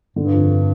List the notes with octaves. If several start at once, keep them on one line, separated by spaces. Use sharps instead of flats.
G2 D3
F2